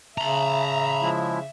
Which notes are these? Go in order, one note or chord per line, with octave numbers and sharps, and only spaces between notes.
C#3 E5 A#5 B5
F3 G#3 E4